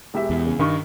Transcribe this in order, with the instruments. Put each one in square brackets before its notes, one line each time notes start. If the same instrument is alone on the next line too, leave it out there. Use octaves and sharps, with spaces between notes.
[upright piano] E1 G4 E5
[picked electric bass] E2
[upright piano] C#3
[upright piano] G2 C#6 [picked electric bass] D#3